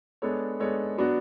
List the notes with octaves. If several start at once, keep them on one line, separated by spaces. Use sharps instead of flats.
G#3 B3 D4 A4 C#5
G#3 B3 D4 A4 C#5
F#3 B3 D4 F#4